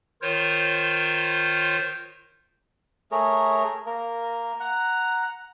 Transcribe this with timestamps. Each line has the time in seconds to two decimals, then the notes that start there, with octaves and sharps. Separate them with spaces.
0.22 D#3 F4 A#4 C5 C#5 G6
3.11 A3 G#4 A#4 C#5
3.86 A#3 A#4
4.60 F#5 A#5